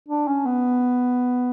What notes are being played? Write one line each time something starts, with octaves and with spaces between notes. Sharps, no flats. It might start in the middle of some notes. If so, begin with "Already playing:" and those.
D4
C#4
B3